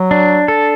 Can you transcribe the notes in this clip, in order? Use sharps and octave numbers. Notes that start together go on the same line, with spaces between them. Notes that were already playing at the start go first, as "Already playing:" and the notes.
Already playing: F#3
D4
A4